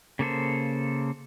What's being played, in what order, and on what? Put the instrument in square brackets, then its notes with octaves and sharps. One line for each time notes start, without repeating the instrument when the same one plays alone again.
[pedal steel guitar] C#3 A#3 A4 C5